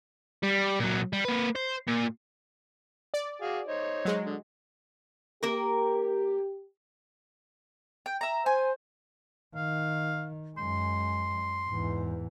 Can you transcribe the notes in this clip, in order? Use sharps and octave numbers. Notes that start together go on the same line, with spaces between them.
G3
A#2 F#3
G3
A#3 B4
C5
A#2
D5
F#4 G#4 F5
D#4 C5 C#5
F#3 G#3
D3
A#3 G4 A#4
G5
E5 A#5
C5 G#5
D#3 F5
F#2 G#3 C6
E2 G#2